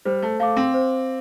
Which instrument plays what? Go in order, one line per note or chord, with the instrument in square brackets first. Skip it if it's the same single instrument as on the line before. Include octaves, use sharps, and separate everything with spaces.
[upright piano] G3 [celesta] C5
[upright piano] A3
[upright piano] A3 [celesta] F5 D6
[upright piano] C4
[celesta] C5